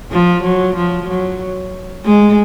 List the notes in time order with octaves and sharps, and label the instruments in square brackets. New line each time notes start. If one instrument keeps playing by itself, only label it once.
[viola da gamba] F3
F#3
F3
F#3
G#3